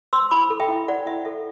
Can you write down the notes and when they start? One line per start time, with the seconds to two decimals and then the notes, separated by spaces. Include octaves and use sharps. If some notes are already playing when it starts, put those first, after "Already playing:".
0.13 C5 C6 E6
0.31 E4 B5 D6
0.50 A4
0.60 E5 G5
0.69 E4
0.88 C5 D5 F#5
1.06 E4 E5
1.25 A4 E5